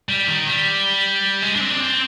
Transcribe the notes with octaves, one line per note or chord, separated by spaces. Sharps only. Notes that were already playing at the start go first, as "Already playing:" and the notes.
G3
D#3
G3
G#3
D4
C4
D4
C4